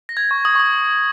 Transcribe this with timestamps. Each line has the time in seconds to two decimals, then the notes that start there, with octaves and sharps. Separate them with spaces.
0.09 A#6
0.17 G#6
0.31 C#6
0.45 D#6
0.55 C#6
0.60 D#6